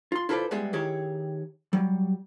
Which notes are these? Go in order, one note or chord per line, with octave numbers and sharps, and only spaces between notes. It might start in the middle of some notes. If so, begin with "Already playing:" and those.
F4 C6
E4 F4 A4 B4 C5 D5
G3 G#3 B3 G#4 E5
D#3 E4 G4 G#4 C#5
F#3 G3